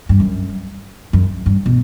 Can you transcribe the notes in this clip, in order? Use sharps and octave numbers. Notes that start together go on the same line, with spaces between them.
G2
F#2
F#2
G2
B2